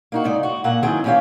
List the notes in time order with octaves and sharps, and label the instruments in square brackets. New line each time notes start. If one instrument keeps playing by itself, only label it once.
[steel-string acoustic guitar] A#3 D#4 F#4
G#2 C#3 D#4 D5
F#4
A#2 A#3 F#5
E2 D#3 F#3 C4 G#4 G5
F#2 E3 A3 C#4 G4 F5